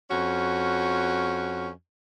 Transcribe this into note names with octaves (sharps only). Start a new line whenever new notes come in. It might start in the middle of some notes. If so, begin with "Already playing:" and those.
F2 C#4 F#4